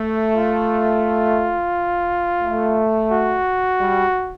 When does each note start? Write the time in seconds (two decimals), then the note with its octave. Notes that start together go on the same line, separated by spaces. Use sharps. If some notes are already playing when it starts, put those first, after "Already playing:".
Already playing: A3
0.36 F4
2.43 A3
3.11 F#4
3.80 G3